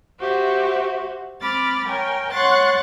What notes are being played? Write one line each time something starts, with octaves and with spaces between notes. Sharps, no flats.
F#4 G4 C5 E5
C4 B5 D6 F6 A6
A#4 C#5 G5 G#5
C#5 F#5 C6 F#6 A6